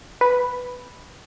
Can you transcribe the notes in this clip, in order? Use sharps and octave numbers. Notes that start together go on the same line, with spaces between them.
B4